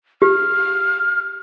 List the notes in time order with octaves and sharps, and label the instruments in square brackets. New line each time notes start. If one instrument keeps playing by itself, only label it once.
[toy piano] G4 [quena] F6